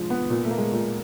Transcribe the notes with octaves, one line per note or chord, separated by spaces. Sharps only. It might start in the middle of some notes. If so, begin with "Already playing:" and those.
Already playing: F3 G#3 D4
B3
A#2 A#3
A3
A#3
G#3
A#2 A3